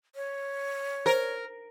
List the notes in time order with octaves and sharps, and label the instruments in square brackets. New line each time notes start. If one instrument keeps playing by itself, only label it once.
[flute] C#5
[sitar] A#4 [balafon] C5